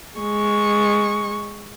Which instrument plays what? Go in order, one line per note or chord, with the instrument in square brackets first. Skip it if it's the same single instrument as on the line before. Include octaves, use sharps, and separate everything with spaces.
[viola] G#3 C#6